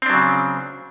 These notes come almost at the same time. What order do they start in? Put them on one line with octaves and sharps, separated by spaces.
C4 D4 F#3 C#3